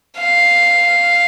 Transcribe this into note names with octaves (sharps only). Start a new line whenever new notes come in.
F5